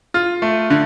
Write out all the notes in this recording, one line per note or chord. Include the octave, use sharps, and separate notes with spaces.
F4
A3
D3